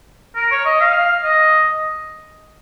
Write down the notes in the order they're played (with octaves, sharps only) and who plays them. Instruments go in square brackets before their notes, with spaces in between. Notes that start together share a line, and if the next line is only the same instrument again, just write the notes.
[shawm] A#4
C#5
D#5
F5
D#5